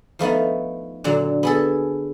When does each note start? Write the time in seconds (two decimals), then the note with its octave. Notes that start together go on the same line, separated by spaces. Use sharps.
0.19 F3 A3 B3 D#4
1.04 A#2 D3 F#3
1.43 B3 G#4 A4